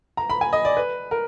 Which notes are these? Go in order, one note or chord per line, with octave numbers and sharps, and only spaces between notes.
A#5
B5
G#5
D#5
D5
B4
A#4